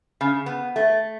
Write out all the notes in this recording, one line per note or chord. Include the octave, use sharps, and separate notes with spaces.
C#3
B3
A3